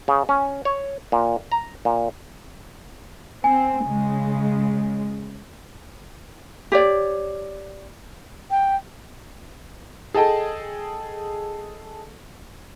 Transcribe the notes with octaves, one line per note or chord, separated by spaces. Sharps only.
C#3
C#4
C#5
A#2
A#5
A#2
C4 G#5
C#3 G#3
G4 C#5 D5
G5
G#4 A4 D#5 G5 A5